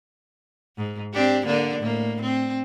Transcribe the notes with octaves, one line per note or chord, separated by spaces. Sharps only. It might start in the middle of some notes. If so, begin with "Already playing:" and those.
G#2
C4 D4 G4
D3 A#3 D4
A2 A#3
C4